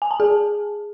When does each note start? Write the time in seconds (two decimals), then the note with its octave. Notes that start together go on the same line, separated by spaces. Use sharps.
0.02 G#5
0.11 A5
0.20 G#4